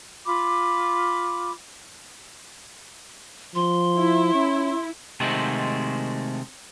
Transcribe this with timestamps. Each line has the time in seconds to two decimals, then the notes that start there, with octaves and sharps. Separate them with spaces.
0.25 F4 B5 D6
3.55 F3 C6
3.97 E4
4.34 C#4
5.20 C3 D#3 G#3 A3 C4 F#4